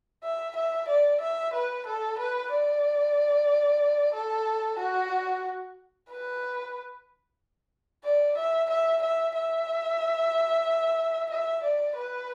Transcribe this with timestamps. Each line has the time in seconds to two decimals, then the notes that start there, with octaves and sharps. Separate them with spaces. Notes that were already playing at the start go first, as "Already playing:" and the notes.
0.24 E5
0.57 E5
0.89 D5
1.21 E5
1.54 B4
1.87 A4
2.19 B4
2.51 D5
4.14 A4
4.79 F#4
6.10 B4
8.05 D5
8.38 E5
8.70 E5
9.03 E5
9.35 E5
11.31 E5
11.63 D5
11.96 B4